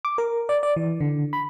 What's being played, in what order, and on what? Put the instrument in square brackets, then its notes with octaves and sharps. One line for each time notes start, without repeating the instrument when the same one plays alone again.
[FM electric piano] D6
A#4
D5
D5
E3
D3
B5